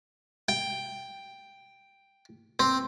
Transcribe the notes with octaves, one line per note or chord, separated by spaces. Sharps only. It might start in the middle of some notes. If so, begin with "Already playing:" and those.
G5
C4